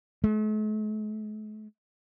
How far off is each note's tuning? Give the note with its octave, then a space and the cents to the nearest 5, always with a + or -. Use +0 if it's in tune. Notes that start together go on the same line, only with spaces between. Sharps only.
A3 -45